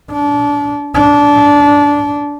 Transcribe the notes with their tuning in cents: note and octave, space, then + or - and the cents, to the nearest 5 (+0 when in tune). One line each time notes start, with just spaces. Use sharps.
D4 -25
D4 -20